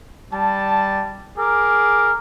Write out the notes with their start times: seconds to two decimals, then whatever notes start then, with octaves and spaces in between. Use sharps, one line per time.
0.32 G3 A5
1.37 G#4 A#4 D6